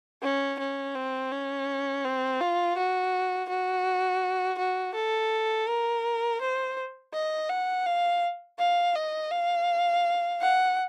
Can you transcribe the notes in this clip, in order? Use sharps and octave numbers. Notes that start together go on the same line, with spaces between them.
C#4
C#4
C4
C#4
C4
F4
F#4
F#4
F#4
A4
A#4
C5
D#5
F#5
F5
F5
D#5
F5
F#5